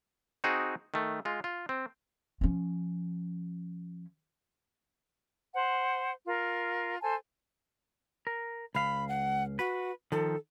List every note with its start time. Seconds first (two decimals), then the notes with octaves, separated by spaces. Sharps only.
0.44 C4 D#4 F#4 G#4
0.94 D#3 A3
1.25 G#3 F4
1.44 F4
1.69 C4
2.41 F3 C#4
5.54 C5 F#5
6.26 F4 A#4
7.01 A4 C5 G#5 A5
8.27 A#4
8.75 C#2 F5 B5
9.09 F#5
9.59 F#4 B4
10.12 D#3 F3 A4